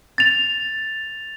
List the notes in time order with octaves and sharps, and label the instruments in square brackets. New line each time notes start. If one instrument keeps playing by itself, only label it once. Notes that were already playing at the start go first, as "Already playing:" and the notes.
[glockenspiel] A6 F7